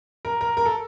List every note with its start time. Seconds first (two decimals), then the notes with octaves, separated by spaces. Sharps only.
0.25 A#4
0.41 A#4
0.57 A#4
0.66 A4